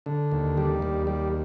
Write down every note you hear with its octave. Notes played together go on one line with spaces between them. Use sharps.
D3
D#2
G3
D#2
G3